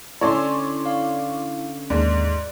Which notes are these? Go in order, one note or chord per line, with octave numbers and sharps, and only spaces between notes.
D3 C#4 E4 A4 C#5 D5 C6
F5
D#2 G#2 A#3 D5